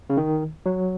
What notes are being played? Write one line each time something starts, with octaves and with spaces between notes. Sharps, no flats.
C#3
D#3
F#3